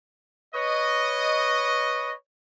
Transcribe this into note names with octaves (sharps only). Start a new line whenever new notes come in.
B4 C#5 D#5